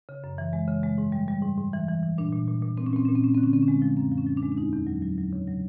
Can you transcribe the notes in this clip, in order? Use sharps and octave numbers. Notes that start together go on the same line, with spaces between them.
C#3
F#2
E3
G#3
C#3
G#3
G#2
G3
G3
G#2
G#2
E3
E3
E3
A#2 D4
A#2
A#2
A#2
A#2 C4
C#4
A#2 C4
A#2 C#4
C4
A3 C#4
D3 C4
C#4
D3 C4
C#4
G#3 C4
F3
F#2 C4
F3
C#4
F3
D4
G#3
D4
E2 D#4
E2
F#3
F#3
F#3
C#3
F#3